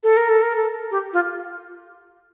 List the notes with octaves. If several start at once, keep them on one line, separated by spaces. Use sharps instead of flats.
A4
A#4
A4
A#4
A4
G4
F4